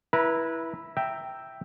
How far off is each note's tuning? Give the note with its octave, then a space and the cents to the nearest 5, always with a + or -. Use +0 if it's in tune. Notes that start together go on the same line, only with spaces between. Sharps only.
E4 +0 B4 -25 A#5 +0
E5 +0 G5 +0 A#5 -15